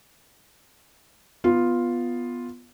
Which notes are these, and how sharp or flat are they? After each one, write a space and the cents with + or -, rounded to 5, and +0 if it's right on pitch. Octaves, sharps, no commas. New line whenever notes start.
B3 +0 F4 +0